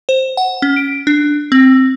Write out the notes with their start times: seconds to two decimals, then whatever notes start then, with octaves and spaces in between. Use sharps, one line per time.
0.09 C5
0.37 F#5
0.62 C#4
0.76 D7
1.07 D4
1.52 C4